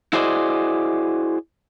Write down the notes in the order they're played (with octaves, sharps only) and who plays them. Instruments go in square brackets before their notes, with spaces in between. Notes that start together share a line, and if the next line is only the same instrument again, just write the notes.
[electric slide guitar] E4 F#4 G#4 C5 D5 D#5